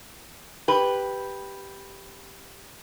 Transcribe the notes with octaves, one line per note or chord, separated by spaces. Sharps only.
G4 B4